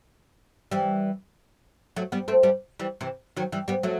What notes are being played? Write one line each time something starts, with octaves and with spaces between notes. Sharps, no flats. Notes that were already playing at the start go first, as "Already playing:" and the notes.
E3 G3
F#3 A3
G3 B3
A3 C4
G3 B3
E3 G3
C3 E3
D#3 F#3
E3 G3
G3 B3
F#3 A3